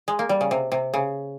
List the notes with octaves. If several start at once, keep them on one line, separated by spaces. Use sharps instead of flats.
G#3
A#3
G3
C#3
C3
C3
C#3